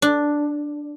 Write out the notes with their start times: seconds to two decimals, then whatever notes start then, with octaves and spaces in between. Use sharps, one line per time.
0.02 D4